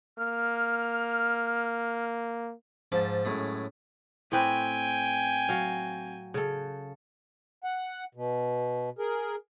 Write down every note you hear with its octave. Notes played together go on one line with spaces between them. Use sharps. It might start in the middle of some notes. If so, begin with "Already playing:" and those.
A#3 F6
G#2 F3 A5
F#2 A2 G#3
A2 C4 B4 G5 G#5
F#3 F5
C#3 A4
F#5
B2
G#4 A#4